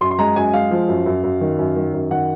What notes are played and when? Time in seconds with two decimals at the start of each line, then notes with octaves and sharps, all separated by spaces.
0.01 F#2 C6
0.11 C6
0.19 G#3 A#5
0.36 F#2 G#5
0.53 G#3 F5
0.71 F3
0.88 F#2
1.06 F#2
1.24 F#2
1.41 D#3
1.59 F#2
1.76 D#3
1.94 F#2
2.11 D#3 F#5